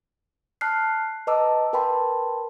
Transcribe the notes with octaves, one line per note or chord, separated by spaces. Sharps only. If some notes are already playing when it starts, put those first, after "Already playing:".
A5 F6 F#6 C7
B4 D#5 A5 A#5 D6 E6
A#4 B4 G5 A5 B5 C6